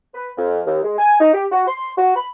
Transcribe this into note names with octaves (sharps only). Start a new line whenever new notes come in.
B4
F2
D#2
G#3
G#5
D#4
G4
F#4
C6
F#4
B5